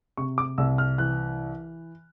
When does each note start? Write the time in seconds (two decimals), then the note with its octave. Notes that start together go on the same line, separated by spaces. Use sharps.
0.17 C3 C#6
0.38 D6
0.58 C2 E6
0.78 F6
0.98 E3 F#6